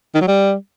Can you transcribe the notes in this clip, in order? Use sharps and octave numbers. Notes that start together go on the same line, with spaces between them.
D#3
F#3
G3